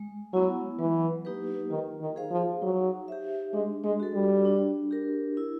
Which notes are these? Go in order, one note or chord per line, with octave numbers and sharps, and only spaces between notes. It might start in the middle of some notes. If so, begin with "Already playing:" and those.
Already playing: G#3
F#3 B3 E4
E3 F#3
A#3 D#4 G4 B4
D#3 F4
D#3
G#4 C5 F5
F3
F#3 D#4
G4 C5 E5
G#3 D4
G#3
F#4 A4
G3
D4
G4 A#4
E4